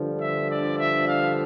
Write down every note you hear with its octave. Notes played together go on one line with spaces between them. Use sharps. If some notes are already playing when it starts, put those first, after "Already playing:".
Already playing: G2 D3 F3
E5
D5
E5
F5